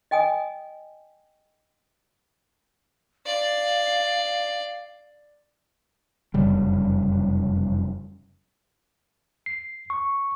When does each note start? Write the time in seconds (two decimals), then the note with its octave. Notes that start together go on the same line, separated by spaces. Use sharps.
0.11 D#5 G5 G#5 D#6
3.26 D5 F5
6.34 F1 F#2 C#3 G3
9.46 C7
9.90 C#6